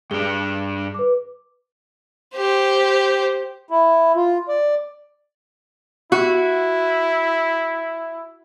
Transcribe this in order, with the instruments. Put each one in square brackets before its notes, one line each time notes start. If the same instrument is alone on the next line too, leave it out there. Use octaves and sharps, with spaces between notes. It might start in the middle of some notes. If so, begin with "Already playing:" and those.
[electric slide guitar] G2 D4 [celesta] G#4 G7
[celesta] B4 D6
[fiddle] G4 C5
[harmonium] E4
F4
D5
[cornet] E4 [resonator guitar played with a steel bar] F#4